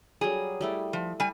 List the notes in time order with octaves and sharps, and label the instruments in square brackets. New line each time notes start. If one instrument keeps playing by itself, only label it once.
[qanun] F#3 G3 [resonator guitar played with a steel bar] G#4
[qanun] G3 A3 E4
[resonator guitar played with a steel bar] F3
G3 G#5